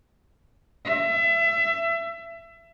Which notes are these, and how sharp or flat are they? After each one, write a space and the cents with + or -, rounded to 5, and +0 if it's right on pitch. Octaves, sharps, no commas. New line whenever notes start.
E5 +25